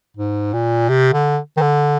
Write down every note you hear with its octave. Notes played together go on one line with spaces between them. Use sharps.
G#2
A#2
C3
D3
D#3
D3